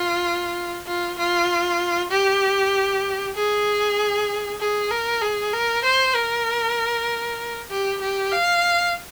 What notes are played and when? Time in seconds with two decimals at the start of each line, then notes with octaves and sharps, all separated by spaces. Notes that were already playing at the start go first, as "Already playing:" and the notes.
Already playing: F4
0.87 F4
1.18 F4
2.11 G4
3.36 G#4
4.60 G#4
4.91 A#4
5.22 G#4
5.53 A#4
5.84 C5
6.15 A#4
7.70 G4
8.01 G4
8.32 F5